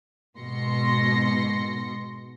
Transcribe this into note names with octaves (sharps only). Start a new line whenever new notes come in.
G#2 B2 C6 A#6 C#7